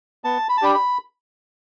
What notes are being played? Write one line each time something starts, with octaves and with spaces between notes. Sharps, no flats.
B3 A5
B5
A5
D4 G4 B5
B5